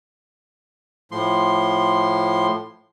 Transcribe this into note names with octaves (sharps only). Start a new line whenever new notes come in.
A2 F3 C6